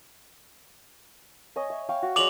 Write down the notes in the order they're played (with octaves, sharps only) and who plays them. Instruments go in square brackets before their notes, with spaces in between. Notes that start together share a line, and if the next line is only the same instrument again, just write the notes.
[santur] C#5 D#5 G#5
E5
F5 G5 C#6
F#4
[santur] F#3 G#3 D5 [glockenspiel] D6 F7 F#7